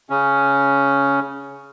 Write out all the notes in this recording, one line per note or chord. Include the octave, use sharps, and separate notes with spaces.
C#3 C#4